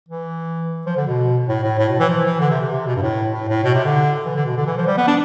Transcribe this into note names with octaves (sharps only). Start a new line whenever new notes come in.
E3
F3
D3
B2
A2
A2
A2
B2
E3
F3
E3
D3
C3
C3
C3
B2
G2
A2
A2
A2
B2
C3
D3
E3
D3
B2
D3
E3
F3
G3
B3
D4